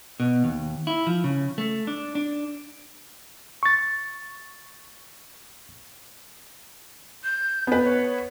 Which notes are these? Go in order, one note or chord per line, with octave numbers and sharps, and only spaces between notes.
B2
D#2
E4
F3
C#3
A3
D4
D4
C#6 A6
G6
B3 B4
C#5